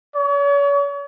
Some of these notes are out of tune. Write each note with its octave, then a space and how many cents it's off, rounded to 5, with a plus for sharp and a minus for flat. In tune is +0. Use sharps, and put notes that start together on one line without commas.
C#5 +40